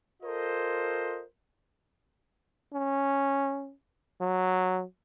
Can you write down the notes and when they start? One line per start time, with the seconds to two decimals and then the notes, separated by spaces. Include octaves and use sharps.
0.23 F4 A4 A#4 C5 D#5
2.73 C#4
4.21 F#3